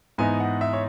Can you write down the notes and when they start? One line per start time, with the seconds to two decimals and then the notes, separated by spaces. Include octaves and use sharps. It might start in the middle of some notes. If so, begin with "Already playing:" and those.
0.18 G#2 E3 B3 D#4 G#5
0.40 F#5
0.61 E5
0.73 C#5